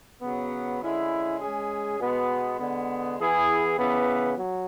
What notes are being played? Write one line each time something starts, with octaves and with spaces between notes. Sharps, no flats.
C#3 F#3 B3
D3 G#3 C#4 E4
G#3 C#4 G#4
B2 G#3 B3
D3 G#3 B3
E3 B3 E4 G#4
C#3 E3 B3
F#3